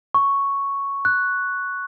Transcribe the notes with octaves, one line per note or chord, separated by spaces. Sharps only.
C#6
F#6